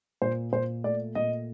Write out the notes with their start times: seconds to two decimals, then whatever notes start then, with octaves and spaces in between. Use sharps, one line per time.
0.22 A#2 C5
0.53 A#2 C5
0.84 A3 D5
1.15 A#2 D#5